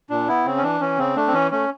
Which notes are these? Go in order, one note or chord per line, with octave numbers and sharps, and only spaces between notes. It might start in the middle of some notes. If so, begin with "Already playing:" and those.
A#2 D4
B3 E4
C#3 C4
C#4
E3 D4
E3 C#4
C#3 C4
A3 D4
C4
E3 C#4
A3 C#4